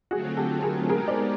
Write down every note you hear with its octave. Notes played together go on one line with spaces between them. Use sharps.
D3 F#3 A3 C4 F4 F#4 G#4
G4 A4
G#4 A#4
G#3 B3 D#4 G4 G#4 A#4
C5 D5